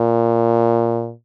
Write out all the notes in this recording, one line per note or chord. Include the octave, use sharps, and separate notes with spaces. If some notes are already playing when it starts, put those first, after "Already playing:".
Already playing: A#2